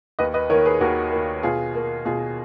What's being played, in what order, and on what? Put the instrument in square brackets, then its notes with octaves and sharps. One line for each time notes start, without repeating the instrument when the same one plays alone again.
[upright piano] D#2 B4 D#5
B4 D#5
D#3 A#4 C#5
A#3
G#4 B4
D#2 F#4 A#4
D#3 A#3
B2 F4 G#4
A#3
B2 F4 G#4